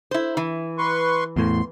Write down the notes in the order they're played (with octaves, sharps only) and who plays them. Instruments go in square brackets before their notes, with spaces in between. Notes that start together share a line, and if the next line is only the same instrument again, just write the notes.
[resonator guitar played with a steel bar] E4 C5
E3
[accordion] B4 C6 C#6
[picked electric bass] E2 A2 [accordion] C6